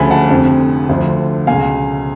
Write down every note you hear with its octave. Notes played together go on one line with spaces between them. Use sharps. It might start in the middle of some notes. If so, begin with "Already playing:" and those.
Already playing: D2 C#3 F3 G#5 B5
F#5 A5
F1 F2 D3 F3
D2 D3 F3
C#2 B2 F5 G#5